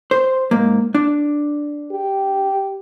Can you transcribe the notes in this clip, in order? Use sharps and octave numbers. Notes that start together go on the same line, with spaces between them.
C5
G#2 A#3
D4
G4